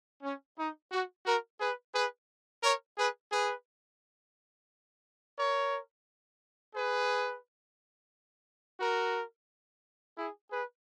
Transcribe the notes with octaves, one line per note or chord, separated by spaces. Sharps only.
C#4
D#4
F#4
F#4 A#4
G#4 B4
G#4 B4
A#4 C#5
G#4 B4
G#4 B4
A#4 C#5
G#4 B4
F#4 A#4
E4 G#4
G#4 B4